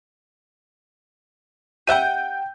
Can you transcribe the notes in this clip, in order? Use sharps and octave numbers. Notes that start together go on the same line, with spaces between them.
G4 E5 F#5 G5 G6 D#7